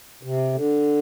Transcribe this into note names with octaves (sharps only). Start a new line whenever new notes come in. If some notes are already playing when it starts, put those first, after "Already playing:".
C3
D3